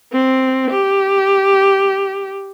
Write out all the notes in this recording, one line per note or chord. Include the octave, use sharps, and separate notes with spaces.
C4
G4